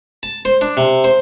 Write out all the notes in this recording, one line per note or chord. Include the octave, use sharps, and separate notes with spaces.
A5
C5
D4
C3
C5